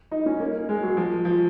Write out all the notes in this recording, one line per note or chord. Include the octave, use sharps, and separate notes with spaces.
D#4
C#4
A#3
G#3
F#3
F3
F3